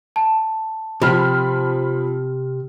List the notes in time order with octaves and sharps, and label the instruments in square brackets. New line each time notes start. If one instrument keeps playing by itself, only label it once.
[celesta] A5
[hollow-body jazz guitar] C3 [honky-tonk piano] F3 B5 F6